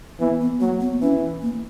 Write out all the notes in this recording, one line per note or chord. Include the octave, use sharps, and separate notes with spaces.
E3 B3
B3
F#3 A#3
B3
E3 C#4
A#3